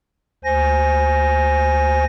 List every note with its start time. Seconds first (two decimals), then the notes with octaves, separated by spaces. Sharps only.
0.44 D2 C5 G#5 A#6